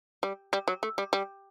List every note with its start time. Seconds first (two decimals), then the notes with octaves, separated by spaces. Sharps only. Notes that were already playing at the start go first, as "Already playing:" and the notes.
0.23 G3
0.53 G3
0.68 F#3
0.83 A3
0.98 G3
1.13 G3